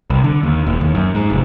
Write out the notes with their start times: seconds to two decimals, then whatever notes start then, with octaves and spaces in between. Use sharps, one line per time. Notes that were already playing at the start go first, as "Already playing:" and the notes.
0.10 C2
0.24 D3
0.43 D#2
0.67 E1
0.81 D#2
0.95 F#2
1.15 G#2
1.30 F1